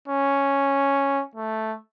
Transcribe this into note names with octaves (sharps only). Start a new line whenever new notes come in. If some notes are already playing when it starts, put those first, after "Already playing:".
C#4
A3